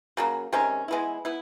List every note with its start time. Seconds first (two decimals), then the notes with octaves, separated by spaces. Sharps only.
0.17 C#3 F#3 A#3
0.53 C3 D#3 G#3 C#4
0.88 E3 G#3 B3 E4
1.25 B3 E4